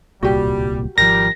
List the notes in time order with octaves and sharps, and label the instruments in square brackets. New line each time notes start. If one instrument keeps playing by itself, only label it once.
[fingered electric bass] D1 C2 A#2 [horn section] G3 [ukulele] F#4 G4
[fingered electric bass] G#1 F3 [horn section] G3 A#4 [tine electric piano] A#6